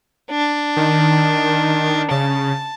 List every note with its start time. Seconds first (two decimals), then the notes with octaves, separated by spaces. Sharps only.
0.31 D4
0.77 D#3
2.11 C#3 A5